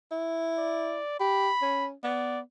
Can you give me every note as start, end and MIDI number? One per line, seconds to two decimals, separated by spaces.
0.12 0.99 64
0.58 1.19 74
1.20 1.49 67
1.20 1.87 83
1.62 1.93 61
2.04 2.40 59
2.04 2.40 74